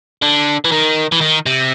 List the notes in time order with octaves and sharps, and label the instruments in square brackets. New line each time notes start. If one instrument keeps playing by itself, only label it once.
[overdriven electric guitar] D3
E3
D#3
E3
D#3
C3